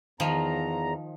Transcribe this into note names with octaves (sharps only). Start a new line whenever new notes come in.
E2 D#3 F3 A#5